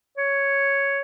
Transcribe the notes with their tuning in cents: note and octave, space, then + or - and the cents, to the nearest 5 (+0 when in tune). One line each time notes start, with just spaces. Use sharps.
C#5 +0